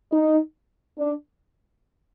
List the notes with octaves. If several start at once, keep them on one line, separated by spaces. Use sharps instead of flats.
D#4
D4